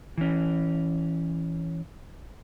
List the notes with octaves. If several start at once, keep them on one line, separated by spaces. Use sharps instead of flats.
E3 C#4